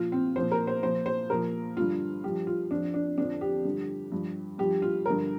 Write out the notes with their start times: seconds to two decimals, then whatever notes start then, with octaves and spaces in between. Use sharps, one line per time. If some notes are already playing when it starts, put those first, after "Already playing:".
Already playing: A#2 F3 F4
0.12 C4
0.36 A#2 F3 C5
0.52 A#4
0.67 C5
0.83 A#2 F3 C5
1.06 C5
1.30 A#2 F3 A#4
1.77 G2 D3 F3 F4
2.24 G2 F3 G4
2.47 F4
2.71 F2 F3 D4
2.94 D4
3.18 F2 D3 F3 D4
3.41 G4
3.65 G2 D3 F3
4.12 G2 F3
4.58 G2 F3 G4
4.82 F4
5.06 G2 D3 F3 A#4